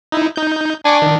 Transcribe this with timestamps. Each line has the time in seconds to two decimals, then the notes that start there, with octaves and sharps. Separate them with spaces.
0.12 D#4 E4
0.36 D#4 G6
0.85 D4 G#5 C#6 D6
1.02 D#3